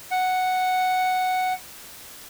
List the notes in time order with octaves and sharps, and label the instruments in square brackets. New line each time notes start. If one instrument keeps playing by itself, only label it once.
[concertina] F#5